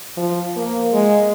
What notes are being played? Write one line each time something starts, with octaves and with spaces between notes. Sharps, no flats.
F3
A#3
G#3